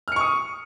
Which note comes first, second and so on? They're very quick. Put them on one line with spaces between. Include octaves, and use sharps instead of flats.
F6 C#7 C#6 D#6